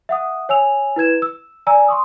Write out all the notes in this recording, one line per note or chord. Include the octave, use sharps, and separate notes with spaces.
E5 F#5 D#6
C#5 G#5 E6 F7
E4 B4 G#6 E7
E6
D5 G#5 A#5 E6
C6 C#6 D#6